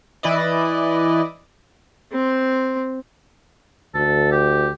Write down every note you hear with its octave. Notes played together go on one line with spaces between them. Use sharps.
E3 E4 B4 D5 D#5
C4 C5
D2 A4
G4